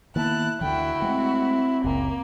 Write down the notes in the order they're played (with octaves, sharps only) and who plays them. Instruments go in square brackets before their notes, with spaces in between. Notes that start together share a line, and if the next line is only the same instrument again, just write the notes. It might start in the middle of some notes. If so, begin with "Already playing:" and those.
[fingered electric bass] D#3 A#3 B3 [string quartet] E4 A5 F#6
[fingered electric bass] D2 D3 E3 [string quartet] E4 F#4 [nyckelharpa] G5
[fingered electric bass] G#3 A3 [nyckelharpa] C4
[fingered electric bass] F#1 C#2 [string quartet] A#3